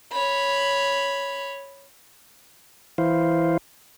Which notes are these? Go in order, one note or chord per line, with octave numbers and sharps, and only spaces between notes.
C#5 B5
E3 E4 C5 F5